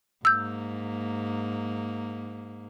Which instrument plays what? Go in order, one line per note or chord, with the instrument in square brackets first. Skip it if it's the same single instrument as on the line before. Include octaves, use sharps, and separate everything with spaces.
[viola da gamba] G#2 A#3 [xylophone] E6 G6